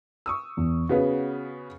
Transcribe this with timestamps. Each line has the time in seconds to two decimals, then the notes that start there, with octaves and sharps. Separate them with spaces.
0.26 C#6 D#6 E6
0.57 E2
0.89 C#3 B3 C#4 F#4 B4 F5